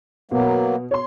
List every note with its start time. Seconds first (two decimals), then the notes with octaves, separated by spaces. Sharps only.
0.31 B2 F#3 A#3 B3
0.91 C#5 C6